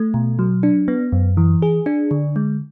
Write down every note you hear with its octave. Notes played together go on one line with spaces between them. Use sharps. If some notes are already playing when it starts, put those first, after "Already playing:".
Already playing: A3
B2
F#3
D4
B3
F#2
E3
G#4
D4
D3
G#3